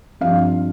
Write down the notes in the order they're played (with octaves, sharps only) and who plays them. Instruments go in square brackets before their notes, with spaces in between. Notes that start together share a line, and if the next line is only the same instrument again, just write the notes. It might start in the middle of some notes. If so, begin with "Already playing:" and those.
[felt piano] G2 F3 C4 F5